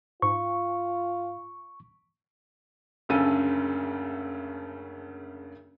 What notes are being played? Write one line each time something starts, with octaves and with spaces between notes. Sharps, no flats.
G#2 F4 C#6
F#1 D2 C#3 C#4 A4 D#7